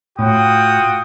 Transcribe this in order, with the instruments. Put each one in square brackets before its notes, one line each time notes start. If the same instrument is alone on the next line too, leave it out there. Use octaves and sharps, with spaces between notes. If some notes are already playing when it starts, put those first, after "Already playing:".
[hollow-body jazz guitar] A2 [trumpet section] F4 F#4 D#6 [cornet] G5